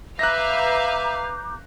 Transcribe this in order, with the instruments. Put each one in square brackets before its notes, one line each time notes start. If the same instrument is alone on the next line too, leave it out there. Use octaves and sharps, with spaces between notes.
[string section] B4 F5 [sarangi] E5 [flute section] A#5 D6 G6 [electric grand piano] F#6 A#6